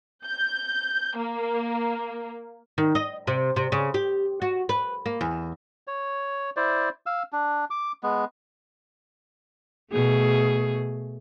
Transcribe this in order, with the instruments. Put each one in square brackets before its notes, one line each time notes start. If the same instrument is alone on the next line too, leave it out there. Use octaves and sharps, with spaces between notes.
[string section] G6
A#3
[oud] D#3
D#5
C3
C3
C#3
G4
F#4
B4
A#3
E2
[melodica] C#5
E4 C5 D5
F5 E6
D4
D6
G#3 B3
[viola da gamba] B2 A3 G#4